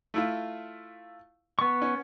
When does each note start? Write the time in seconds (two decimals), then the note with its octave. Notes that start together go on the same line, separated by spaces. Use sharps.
0.14 A3 E4 F4
1.59 B3 C#6
1.82 C#4